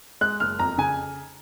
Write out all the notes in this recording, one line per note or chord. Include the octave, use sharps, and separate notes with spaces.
G#3 F#6
F#1 F6
F2 A#5
C#3 G#5